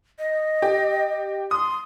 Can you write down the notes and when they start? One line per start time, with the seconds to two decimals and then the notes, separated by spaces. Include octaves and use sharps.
0.19 D#5
0.62 G4
1.51 C6 D#6